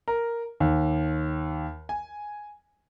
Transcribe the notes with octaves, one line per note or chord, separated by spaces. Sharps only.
A#4
D#2
G#5